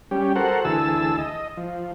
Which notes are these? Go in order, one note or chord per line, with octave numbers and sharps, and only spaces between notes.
G3 C#4 G4
F#4 A4 A#4 C5 F#5
D2 E3 G#4 A5 E6
D#5
F3